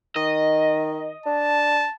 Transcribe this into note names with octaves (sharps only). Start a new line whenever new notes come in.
D#3 D#5
D4 A5